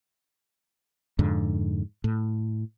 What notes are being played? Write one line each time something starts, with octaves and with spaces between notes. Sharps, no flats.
F2 G#2 D3
A2